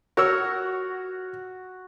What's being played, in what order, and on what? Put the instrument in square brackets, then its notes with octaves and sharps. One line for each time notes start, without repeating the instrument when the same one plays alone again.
[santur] F#4 [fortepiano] A#4 C#5 E6